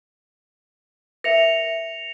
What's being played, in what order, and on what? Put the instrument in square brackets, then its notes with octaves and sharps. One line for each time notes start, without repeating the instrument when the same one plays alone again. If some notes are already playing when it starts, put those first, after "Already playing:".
[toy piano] A#4 E5 [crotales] A#6 C#7 F7